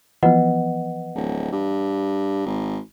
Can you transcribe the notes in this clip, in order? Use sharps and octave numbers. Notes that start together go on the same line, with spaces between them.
E3 F3 B3 B4 D#5 F#5
D1
G2
G#1